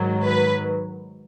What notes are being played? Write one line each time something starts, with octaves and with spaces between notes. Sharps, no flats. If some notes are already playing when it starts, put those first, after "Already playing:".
Already playing: G#2 D#3 F#3
B4